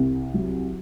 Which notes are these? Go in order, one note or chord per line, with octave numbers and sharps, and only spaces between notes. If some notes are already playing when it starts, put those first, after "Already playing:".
Already playing: C2
F#3